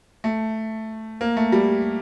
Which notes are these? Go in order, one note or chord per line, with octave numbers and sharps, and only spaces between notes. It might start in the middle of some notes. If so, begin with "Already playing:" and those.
A3
A#3
A3
G3